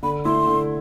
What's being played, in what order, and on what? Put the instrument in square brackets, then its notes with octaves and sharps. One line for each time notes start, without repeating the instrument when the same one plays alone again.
[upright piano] D3 [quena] B5
[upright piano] A3 E4 [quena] C6
[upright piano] D3